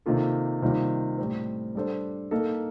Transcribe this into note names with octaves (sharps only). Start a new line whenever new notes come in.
C3 D#3 A#3 F4 A4
C3 D#3 G3 A#3 F4
A2 G3 C4
G3 D4 A4 C5
A#3 D#4 A4